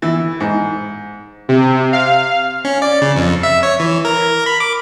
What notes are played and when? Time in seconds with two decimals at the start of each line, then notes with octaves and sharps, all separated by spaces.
0.02 E3
0.40 G#2
1.49 C3
1.93 F5
2.65 C#4
2.82 D5
3.01 C#3
3.16 F2
3.43 E5
3.63 C#5
3.79 E3
4.05 A#4
4.46 B5
4.60 D6